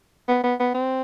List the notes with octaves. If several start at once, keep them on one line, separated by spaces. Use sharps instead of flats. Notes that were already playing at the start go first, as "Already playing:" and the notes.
B3
B3
B3
C4